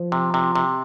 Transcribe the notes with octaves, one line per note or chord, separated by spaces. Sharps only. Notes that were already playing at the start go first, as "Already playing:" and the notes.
Already playing: F3
C3
C3
C3